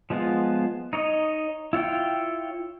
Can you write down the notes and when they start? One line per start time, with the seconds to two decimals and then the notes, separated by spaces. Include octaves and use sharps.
0.10 F3 G#3 B3 F4
0.93 D#4 C#5 D#5
1.73 E4 F4 C#5 G5